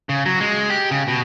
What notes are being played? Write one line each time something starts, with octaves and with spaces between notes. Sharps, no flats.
C#3
F#3
G#3
G4
C#3
B2